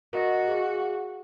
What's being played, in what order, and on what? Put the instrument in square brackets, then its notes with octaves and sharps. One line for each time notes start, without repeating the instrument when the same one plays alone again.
[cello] F#4 [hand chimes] A#4 D#5 A#6
[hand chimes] G#4 F5